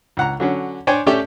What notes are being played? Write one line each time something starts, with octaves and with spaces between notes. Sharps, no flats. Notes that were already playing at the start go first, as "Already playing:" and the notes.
C#2 F#5 A#5
D3 F#3 C#4
D4 C5 C#5 G5 G#5
A3 C#4 G4 D5 E5 G5